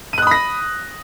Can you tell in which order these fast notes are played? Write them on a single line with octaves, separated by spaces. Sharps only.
D#7 F#6 D#6 B5 A#6